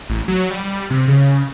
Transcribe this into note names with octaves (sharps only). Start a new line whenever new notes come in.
A1
F#3
G3
C3
C#3